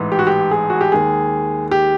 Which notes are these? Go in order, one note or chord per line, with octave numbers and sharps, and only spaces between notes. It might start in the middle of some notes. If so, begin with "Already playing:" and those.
Already playing: A1 G#2 E3
G4
F#4
G4
G#4
F#4
G4
D#2 D#3 G#3 G#4
G4